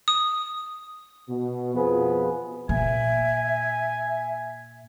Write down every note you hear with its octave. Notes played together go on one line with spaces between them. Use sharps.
D#6
B2
F2 B2 F3 B3 G#4 B4
A#2 E5 G#5